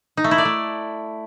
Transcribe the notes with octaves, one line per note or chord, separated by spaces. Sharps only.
D#4
A3
E4
D5
A3